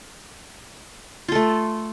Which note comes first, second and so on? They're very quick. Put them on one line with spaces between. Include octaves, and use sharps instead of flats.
F4 A4 A3